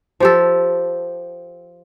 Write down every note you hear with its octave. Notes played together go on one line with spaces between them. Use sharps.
F3 G4 A4